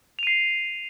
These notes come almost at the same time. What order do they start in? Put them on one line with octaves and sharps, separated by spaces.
F7 D#7 C7